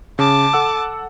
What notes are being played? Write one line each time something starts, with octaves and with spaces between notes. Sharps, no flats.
C#3 A5 D6
A4 F#5 E6